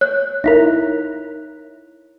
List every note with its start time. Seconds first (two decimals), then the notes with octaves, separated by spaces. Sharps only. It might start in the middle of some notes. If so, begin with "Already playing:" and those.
0.01 C#5 F#6
0.44 D#4 E4 A#4